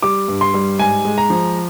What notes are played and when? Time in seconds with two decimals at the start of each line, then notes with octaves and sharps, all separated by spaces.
0.03 G3 D6
0.28 G2
0.41 C6
0.54 G3
0.79 G#2 G#5
1.05 G#3
1.18 A#5
1.30 F3